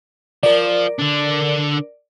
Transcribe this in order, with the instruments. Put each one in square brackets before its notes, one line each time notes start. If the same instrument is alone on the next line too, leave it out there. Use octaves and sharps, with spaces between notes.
[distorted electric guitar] F3 [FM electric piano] A#4 D5
[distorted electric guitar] D3 D4